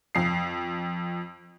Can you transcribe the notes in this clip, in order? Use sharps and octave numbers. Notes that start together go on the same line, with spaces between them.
F2 C7